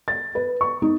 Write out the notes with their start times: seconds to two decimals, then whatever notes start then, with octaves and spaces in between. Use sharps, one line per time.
0.08 A6
0.35 B4
0.61 C#6
0.82 D#4